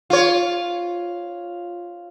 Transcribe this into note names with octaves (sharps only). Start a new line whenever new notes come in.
F4 C#5